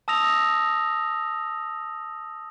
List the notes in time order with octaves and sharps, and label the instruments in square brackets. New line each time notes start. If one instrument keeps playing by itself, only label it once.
[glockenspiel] A5 D#6 E6 A#6 F7